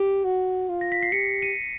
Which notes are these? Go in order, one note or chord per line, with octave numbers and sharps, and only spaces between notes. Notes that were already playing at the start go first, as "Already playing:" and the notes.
Already playing: G4
F#4
F4
A#6
B6
C7
G4 B6 C#7
C#7 D#7